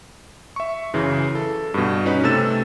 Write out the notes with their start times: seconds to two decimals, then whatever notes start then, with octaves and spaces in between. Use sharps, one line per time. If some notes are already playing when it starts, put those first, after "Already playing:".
0.56 E5 C#6
0.94 F#2 C#3 E3
1.35 A4
1.74 G2 B2
2.06 C#4 D#4 F#4 B4
2.24 C3 A3 A4 E6 A6 E7